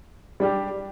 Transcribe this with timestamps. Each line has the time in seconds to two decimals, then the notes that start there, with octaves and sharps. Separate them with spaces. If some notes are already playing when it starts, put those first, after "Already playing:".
0.40 G3 D4 G4